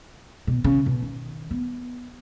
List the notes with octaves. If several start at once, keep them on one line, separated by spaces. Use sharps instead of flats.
B2
C#3
B2
D#3
B3